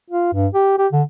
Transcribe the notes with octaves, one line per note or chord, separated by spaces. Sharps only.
F4
G2
G4
G4
D3